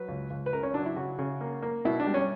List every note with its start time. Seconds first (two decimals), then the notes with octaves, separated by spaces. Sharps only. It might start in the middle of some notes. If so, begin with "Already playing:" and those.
Already playing: F#3 B4
0.08 C#2
0.30 C#2
0.46 B4
0.53 C#3 A#4
0.63 C#4
0.74 F#3 D4
0.86 E4
0.96 C#3 F#4
1.19 C#3
1.41 A#3
1.62 A#3
1.85 B2 E4
2.00 D4
2.07 G3
2.14 C#4